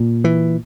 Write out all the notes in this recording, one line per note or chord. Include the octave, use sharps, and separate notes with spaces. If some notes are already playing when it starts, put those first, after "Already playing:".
Already playing: A#2
E3